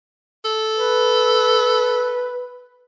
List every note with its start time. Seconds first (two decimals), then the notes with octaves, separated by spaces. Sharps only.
0.45 A4
0.76 B4